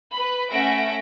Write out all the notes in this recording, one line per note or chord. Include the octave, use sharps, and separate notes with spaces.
B4 B5
A3 C#4 E5 F#5 A#6 D7